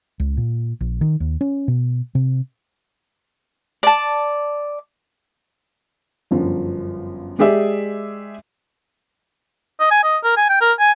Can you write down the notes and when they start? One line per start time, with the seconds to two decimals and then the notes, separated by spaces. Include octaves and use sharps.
0.20 C#2
0.37 A#2
0.81 A#1
1.01 D#3
1.20 D#2
1.41 C#4
1.68 B2
2.15 C3
3.83 D5 A5
6.31 G1 F#2 F3
7.39 G#3 G4 G#4 D5 E5
9.80 D#5
9.91 G#5
10.03 D#5
10.24 A#4
10.37 G#5
10.49 G5
10.61 A#4
10.80 G#5